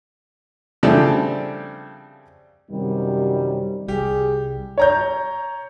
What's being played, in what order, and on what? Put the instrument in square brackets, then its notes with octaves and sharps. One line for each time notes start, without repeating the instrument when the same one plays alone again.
[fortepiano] C#3 F3 G3 A3 C4 D4
[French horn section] F#2 C3 D#3 G3
[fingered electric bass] C2 G3 [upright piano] G4 [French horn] G#4
[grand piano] C#5 A#5 G6